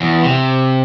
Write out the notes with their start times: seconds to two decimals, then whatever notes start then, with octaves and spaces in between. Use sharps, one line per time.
0.01 E2
0.23 C3